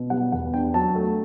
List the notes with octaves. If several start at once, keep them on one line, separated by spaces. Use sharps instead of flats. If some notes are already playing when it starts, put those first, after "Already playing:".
Already playing: B2
G3 F#5
E2 F#5
D4 G5
F#3 A5
A3